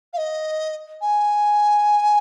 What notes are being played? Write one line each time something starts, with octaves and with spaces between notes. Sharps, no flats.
F5
D#5
G#5